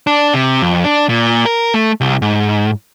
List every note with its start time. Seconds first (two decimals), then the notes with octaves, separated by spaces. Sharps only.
0.07 D4
0.34 C3
0.62 F2
0.85 D4
1.09 A#2
1.46 A#4
1.74 A3
2.01 C2
2.22 G#2